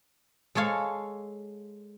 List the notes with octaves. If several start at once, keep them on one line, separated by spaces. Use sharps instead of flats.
G#3 A4 C#5 F5